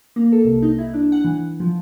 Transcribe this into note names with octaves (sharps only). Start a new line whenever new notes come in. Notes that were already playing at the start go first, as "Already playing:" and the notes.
A#3
A4
C2
D#4
E4
D4
F#5
E3
F3